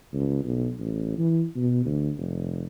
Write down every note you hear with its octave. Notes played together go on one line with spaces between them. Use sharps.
C#2
B1
A1
E3
B2
D2
F1